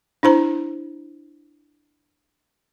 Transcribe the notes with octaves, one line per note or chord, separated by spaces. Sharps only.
D4 E4 C5 A#5